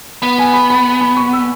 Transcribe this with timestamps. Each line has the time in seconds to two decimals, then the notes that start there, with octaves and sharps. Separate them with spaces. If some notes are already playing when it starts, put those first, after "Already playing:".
0.22 B3 B5
0.38 G#5
0.54 B5
0.70 B5
1.01 B5
1.17 C#6
1.33 E6